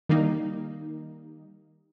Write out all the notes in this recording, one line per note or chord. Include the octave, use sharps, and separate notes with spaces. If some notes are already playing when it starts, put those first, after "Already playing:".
D#3 G3 A#3 D#4